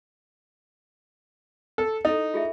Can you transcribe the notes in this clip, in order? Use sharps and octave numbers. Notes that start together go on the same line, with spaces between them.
A4
D#4 E4 A4
F4 G#4 E5